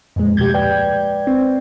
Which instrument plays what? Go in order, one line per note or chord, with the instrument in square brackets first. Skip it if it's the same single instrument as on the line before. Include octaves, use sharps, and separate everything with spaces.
[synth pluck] F2 A#2 G#3
[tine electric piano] D2 B2 G4 [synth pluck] G6 G#6
[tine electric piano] B4 D5 G5
[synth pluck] C4